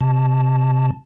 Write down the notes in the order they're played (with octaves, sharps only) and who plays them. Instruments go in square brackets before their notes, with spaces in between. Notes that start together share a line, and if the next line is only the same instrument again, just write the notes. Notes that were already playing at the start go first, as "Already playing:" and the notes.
[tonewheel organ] C3 A5